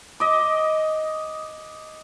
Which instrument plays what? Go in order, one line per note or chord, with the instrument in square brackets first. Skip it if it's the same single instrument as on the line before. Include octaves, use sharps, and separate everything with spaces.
[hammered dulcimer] D#5 D6